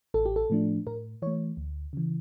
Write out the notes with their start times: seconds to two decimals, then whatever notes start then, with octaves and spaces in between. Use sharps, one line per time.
0.14 A1 A4
0.26 G4
0.36 A4
0.50 A2 F3 A3 D4
0.87 A2 A#4
1.22 E3 A3 C#5
1.57 D2
1.93 C#3 E3